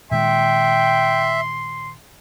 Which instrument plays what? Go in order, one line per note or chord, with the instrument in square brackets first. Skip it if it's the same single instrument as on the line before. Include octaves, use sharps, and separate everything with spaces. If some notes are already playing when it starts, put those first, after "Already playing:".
[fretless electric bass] A#2 D#3 G#3 [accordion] E5 [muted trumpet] G5 [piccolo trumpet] C6